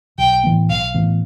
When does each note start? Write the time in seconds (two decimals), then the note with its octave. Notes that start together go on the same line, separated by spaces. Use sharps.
0.18 B1 G5
0.43 A2 E3 B3
0.69 B1 F5
0.94 A2 E3 B3